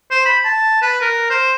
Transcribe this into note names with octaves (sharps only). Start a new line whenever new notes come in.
C5
B5
A5
B4
A#4
C5